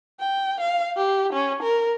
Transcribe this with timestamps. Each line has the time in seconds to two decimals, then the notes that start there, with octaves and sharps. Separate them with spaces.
0.20 G5
0.60 F5
0.96 G4
1.33 C#4
1.63 A#4